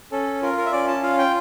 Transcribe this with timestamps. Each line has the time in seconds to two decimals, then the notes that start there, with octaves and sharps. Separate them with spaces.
0.12 C#4 A4
0.42 F4 A#4
0.58 A#4
0.66 E5
0.72 C#4 D5
0.88 A5
1.03 F4 F5
1.19 G5